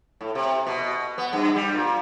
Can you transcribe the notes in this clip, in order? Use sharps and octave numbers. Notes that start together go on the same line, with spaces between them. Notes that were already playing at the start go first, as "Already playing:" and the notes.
A2
C3
B2
B3
G2
G3
A#2